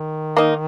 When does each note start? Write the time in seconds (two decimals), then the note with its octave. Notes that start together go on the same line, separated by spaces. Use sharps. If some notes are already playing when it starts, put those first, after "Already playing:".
Already playing: D#3
0.37 A#3 D#4